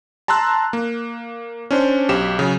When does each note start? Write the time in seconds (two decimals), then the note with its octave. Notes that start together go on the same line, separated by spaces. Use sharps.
0.28 A5 A#5 C6 E6 F#6
0.73 A#3
1.71 C#4 D4 C5
2.09 B1 G4 E7
2.39 C#3 F#3